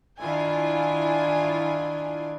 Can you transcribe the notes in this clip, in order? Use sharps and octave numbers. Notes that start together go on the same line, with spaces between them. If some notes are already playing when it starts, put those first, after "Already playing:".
D#3 D4 E4 F4 G#5